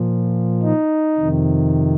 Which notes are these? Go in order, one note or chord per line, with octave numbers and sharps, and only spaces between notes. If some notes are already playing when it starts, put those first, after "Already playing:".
Already playing: A#2 F3
D#4
F2 C3 D#3